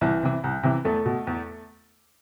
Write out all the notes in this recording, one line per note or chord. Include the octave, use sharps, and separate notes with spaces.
C2 E3 E4
C3 E3
C2
C3 E3
E2 A3 A4
B2
E2